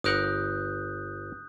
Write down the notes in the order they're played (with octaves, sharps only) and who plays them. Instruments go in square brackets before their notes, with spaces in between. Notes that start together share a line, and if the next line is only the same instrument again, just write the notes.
[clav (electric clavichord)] G1 A#4 F#5 [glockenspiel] D#6 F#6 G6